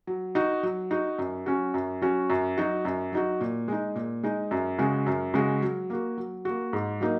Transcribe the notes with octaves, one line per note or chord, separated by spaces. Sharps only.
F#3
D#4 F#4
F#3
D#4 F#4
F#2
F#3 C#4 F#4
F#2
F#3 C#4 F#4
F#2
F#3 D#4 F#4
F#2
F#3 D#4 F#4
A#2
G#3 D#4
A#2
G#3 D#4
F#2
C#3 G#3 F#4
F#2
C#3 G#3 F#4
F#3
A#3 F#4
F#3
A#3 F#4
G#2
F#3 A#3 D#4